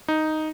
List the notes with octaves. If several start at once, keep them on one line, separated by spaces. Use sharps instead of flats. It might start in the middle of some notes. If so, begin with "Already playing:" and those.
D#4